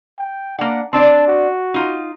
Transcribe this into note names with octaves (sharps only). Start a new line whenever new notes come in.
G5
A#3 D4 F#5
C4 D4 D5 A5
F#4
D#4 F4